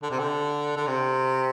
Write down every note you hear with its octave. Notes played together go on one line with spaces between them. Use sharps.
D3
C3
D3
D3
C3